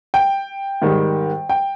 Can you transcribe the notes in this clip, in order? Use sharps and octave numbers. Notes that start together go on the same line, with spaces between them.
G5
G#2 D#3 G3
G5